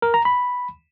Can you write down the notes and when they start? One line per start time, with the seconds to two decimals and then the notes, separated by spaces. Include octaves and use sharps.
0.02 A#4
0.14 A#5
0.25 B5